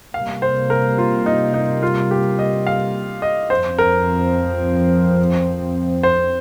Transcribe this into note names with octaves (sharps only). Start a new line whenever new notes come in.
C3 G3 A#3 F5
C5
A#4
F4
D#4
D#4
F4
G4
D#5
F5
D#5
F2 F3 C4 C5
A#4
C5